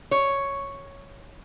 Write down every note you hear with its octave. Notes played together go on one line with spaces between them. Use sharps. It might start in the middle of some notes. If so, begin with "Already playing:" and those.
C#5